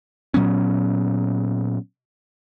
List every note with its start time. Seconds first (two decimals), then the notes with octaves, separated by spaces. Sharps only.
0.34 A#2 F#3 B3 C#4